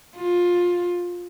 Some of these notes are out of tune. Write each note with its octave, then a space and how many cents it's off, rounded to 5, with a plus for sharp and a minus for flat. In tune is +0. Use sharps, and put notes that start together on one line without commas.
F4 +15